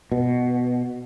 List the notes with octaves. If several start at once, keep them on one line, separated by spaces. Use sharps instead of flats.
B2